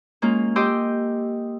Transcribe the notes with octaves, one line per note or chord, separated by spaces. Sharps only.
G#3 A#3 C#4 F4
G4 D#5 G5 C6 E6